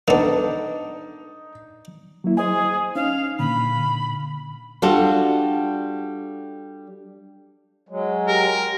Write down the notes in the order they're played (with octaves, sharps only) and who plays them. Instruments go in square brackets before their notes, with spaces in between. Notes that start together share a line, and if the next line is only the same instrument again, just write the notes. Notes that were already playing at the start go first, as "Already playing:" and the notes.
[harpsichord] A#3 B3 [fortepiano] D4 A4 [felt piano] D#4
[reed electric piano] F#3 A#3 E4
[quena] G#4 [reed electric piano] C5 D#5 G#5
[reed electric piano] C#4 D#4 [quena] F5
[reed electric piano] A#2 D3 [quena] B5
[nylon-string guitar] G3 D4 F4 F#4 A4
[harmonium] F#3 G#3
[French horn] G4 [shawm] A#4